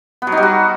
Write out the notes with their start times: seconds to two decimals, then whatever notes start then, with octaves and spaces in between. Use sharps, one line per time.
0.22 B3
0.27 F#3
0.32 D#4
0.37 G3
0.43 F#4